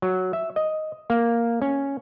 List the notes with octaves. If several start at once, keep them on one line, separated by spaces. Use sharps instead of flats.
F#3
E5
D#5
A#3
C#4